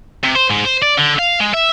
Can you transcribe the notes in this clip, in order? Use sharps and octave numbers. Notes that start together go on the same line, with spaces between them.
C3
C5
G#2
C5
D5
D3
F5
G#3
E5